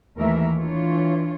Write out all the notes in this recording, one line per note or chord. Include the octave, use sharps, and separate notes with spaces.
D#2 E3 A3 A#4 E5
E3 D4 F4 C#5